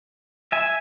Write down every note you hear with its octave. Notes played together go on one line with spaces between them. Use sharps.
E5 G#5